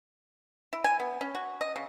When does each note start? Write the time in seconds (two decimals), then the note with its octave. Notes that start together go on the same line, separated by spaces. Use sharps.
0.73 E4
0.84 G#5
1.00 B3
1.21 C#4
1.35 F#4
1.61 D#5
1.76 C#3